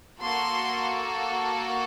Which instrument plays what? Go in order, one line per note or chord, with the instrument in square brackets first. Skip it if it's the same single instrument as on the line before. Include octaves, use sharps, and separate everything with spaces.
[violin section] A#3 F#4 A4 C6